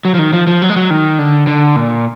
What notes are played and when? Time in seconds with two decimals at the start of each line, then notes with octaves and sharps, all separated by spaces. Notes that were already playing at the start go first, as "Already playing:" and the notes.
0.05 F#3
0.14 F3
0.19 D#3
0.33 F3
0.47 F3
0.62 F#3
0.70 G#3
0.76 F#3
0.91 D#3
1.19 D3
1.47 D3
1.76 A#2